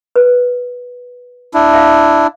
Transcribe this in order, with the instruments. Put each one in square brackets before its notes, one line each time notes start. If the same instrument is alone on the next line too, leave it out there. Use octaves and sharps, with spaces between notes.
[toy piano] B4
[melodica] D4 E4
[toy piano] E5 F5